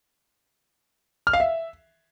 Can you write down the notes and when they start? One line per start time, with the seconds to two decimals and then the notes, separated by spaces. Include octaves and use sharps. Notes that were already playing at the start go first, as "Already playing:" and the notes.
1.27 F6
1.33 F5
1.40 E5